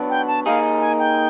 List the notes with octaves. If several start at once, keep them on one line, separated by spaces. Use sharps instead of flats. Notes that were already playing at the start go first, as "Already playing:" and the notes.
Already playing: F#3 B3 D4 F#4
G5
A5
A#3 D#4 G#4 F5
G#5
G5